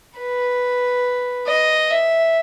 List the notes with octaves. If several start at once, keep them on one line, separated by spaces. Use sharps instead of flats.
B4
D#5
E5